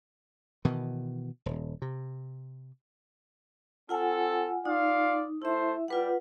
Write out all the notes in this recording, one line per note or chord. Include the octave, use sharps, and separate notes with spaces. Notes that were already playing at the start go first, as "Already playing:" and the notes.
B2 D#3 E3
D#1
C3
C4 F4 A4 F#5 G#5
D#4 F4 D5 F5
A3 E4 C5 E5
G3 F4 B4 F#5